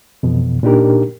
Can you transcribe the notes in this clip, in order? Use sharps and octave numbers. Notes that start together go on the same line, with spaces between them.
F2 B2 E3
A#2 D4 D#4 G4 A#4